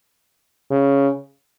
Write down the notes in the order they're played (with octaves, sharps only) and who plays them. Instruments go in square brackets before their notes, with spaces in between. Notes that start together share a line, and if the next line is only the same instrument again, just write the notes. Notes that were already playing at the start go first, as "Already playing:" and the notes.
[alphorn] C#3